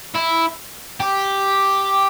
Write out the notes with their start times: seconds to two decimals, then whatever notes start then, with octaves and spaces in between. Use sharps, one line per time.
0.15 E4
1.00 G4